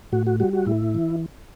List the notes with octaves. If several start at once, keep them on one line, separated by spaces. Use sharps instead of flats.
A2 F#4
F#4
G3 F#4
F#4
A2 E4
E3